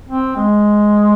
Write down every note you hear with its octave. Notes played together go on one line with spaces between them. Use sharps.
C4
G#3